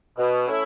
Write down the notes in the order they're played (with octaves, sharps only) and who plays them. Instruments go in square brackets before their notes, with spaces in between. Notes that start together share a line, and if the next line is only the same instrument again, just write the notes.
[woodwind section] B2
A3 C#4 E4